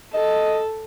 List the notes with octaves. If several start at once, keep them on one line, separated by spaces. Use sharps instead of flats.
A4 D#5